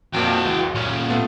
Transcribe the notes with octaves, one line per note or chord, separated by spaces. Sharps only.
F2 A#2 F3 F#4 G5
C#2 E3
F#2
A#2 C#4
A3 B3 F4